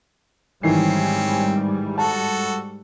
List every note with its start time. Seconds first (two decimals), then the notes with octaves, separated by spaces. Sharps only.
0.63 G#2 D#3 E3 G3 C4 C#4 C7
1.98 F#4 A4 A5